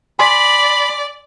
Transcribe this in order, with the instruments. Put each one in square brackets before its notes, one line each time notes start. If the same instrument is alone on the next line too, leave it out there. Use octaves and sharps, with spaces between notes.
[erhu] D5 [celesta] G#5 C6 B6 [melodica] B5